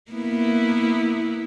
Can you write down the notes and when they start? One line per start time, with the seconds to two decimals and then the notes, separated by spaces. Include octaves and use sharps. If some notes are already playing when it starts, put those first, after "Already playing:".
0.12 A#3 B3 E4